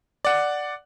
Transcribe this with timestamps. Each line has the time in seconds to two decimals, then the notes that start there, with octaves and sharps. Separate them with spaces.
0.25 D5 F#5